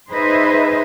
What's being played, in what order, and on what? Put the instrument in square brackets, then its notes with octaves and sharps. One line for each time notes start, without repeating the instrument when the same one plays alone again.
[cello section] D#4 G#4 B4 C5 D#5 E5